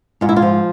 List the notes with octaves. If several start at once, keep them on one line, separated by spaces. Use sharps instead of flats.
G#2 F4
E4
F4
F3